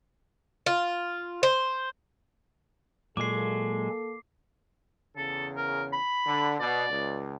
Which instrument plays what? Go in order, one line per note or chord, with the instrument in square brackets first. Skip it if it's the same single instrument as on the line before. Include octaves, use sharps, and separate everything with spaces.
[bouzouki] F4
C5
[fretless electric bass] A#2 [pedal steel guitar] F#3 G#3 [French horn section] A#3 A4 [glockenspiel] D6 C7
[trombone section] E2 C#3 [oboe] A4
[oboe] A#4
B5
[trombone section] D3
[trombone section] B2 [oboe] D5
[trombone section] C#2